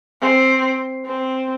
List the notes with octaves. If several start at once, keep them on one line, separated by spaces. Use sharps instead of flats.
C4
C4